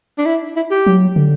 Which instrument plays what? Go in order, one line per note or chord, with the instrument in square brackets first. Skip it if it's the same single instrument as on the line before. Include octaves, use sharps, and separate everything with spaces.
[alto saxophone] D4
E4
E4
G4
[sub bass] F#3
D3